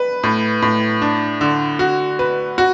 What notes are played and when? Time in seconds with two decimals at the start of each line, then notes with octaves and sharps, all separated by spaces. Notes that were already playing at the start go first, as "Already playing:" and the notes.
Already playing: B4
0.23 A2
0.62 A2
1.02 D4
1.41 D3
1.79 F#4
2.19 B4
2.58 F#4